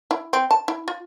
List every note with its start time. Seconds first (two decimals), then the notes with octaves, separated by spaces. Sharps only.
0.11 E4
0.33 C4
0.51 A5
0.68 E4
0.88 F4